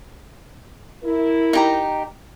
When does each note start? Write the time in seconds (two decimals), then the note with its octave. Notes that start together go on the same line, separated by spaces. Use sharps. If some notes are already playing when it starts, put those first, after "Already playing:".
1.04 E4 A#4
1.53 D#4 G4 A#5